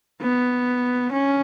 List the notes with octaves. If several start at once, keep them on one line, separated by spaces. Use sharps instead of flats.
B3
C#4